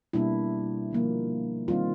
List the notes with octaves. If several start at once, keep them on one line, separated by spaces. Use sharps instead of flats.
B2 G3 A#3 D4 E4
D3 F3 A#3
D#3 G3 C4 D#4 F4